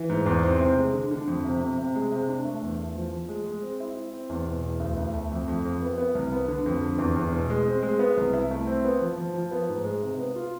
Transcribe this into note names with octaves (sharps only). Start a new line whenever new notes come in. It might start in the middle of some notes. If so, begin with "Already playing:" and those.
Already playing: E3
G#2
E2
C4
C3
G#3
D3
D3
F2
C3
C3
C3
G#3
C3
D4
A3
E2
A3
F3
F3
G#3
G#3
C4
E4
E4
C4
E2
B2
E2
D2
D2
A3
F2
F2
F2
B3
B3
C2
B3
D3
F2
D3
E2
E2
B2
G#3
C4
G#3
B3
C2
E4
A3
C4
B3
F3
F3
F3
B3
G#2
G#3
C3
B3
F4